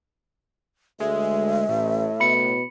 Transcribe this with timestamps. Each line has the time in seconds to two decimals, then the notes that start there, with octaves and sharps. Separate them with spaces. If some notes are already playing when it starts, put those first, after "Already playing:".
1.00 D2 G#3 E5
1.69 A1 A2
2.20 B2 B5 C#7